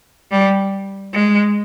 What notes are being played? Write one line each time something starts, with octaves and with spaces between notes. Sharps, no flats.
G3
G#3